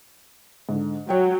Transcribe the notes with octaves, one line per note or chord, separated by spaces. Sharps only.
G#2 D3
F#3 C#5 G5